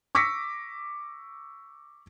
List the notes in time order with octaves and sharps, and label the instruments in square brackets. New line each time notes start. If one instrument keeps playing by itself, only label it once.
[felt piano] C#6 D6 E6 A#6 B6 C#7